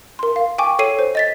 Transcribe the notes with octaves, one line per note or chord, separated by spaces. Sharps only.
A#4 C6
F5
G5 G#5 C#6 D6
A4 C#5 C7 D#7
C5
D#5 A6 B6